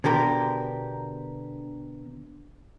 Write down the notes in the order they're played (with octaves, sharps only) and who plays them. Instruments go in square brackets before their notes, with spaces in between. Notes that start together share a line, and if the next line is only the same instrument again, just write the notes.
[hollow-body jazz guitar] B2 D3 G4 A#4